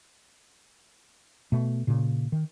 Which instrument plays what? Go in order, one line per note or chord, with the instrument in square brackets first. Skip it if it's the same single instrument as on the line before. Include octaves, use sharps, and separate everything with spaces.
[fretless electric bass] B2 A3
A#2 C#3
D#3